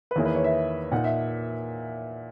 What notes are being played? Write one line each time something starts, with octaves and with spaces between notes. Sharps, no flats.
B4
E2 D#3 A#3 E4 G#4 C#5
B4
C#5
E5
A#2 A#3 D#4 F#5
E5